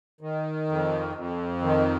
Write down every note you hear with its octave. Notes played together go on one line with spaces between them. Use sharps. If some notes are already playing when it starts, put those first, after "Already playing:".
D#3
F2
F2
D#3